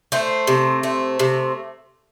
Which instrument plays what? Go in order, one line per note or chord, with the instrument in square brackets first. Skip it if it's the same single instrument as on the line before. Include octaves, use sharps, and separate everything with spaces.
[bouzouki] A3 C5
C3
A3
C3